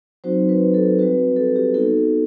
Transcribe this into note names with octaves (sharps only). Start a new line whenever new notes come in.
F#3 C4 D#4 F#4 C5
B4
A4
G3 C4 F#4 B4
A4
G4
B3 D#4 F#4 A4